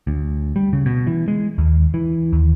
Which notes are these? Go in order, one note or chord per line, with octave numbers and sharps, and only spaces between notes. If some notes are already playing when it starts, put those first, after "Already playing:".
D2
G3
C#3
B2
E3
G#3
D#2
E3
D#2